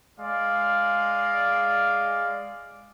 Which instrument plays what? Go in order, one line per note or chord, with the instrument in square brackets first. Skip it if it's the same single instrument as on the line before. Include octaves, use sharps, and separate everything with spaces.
[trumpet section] G#3 D5 F5